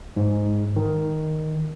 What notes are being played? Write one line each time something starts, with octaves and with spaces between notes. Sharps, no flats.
G#2
D#3